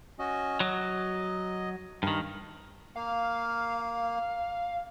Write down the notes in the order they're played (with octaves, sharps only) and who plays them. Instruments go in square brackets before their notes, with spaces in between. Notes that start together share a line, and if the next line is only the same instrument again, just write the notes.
[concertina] C#4 F#4 D#5
[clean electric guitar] F#3 [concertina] D#5
[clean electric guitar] G2 D#3 [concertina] A#4
[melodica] A#3 [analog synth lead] F5